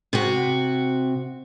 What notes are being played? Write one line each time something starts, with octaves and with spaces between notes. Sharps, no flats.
C3 F#4